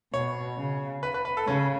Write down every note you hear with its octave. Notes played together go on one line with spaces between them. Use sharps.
B2 C#5
C#3
B4
B4
B4
A4
C#3 C#4